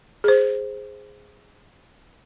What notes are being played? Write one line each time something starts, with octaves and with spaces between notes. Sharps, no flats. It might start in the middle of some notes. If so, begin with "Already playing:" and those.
G#4 C5